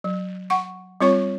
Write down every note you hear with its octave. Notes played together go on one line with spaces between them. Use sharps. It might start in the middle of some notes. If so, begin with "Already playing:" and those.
F#3
F#5 C#6
G3 C4 F4 C#5 C#6